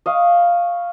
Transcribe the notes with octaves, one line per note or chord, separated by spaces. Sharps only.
D#5 F5 C#6